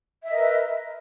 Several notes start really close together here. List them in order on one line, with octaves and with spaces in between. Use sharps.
E5 D#5 A#4 B4